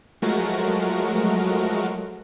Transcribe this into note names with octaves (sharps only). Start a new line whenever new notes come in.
F3 F#3 G#3 A3 F#4 A#4